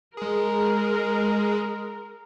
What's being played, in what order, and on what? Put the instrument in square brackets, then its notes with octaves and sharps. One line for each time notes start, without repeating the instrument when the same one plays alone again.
[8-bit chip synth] G#3 G#4 [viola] A#4